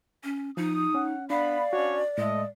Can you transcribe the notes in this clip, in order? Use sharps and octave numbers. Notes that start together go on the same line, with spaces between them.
C#4
F3 D#4 D#6
C#4 F#5
B3 D4 D5 F5 B5
C#4 D4 F#4 C#5
A2 G#3 A4 D#5 E5